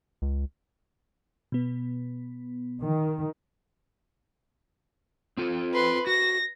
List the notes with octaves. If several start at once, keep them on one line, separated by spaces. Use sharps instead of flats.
C#2
B2 B3
D#3
C4 F4 A4
B4 C6
F#4 A#6